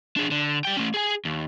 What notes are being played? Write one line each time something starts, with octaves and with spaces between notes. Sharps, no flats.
D4 G#4
D3
G3 G5
A3 C#4
G#4 G#5
D#2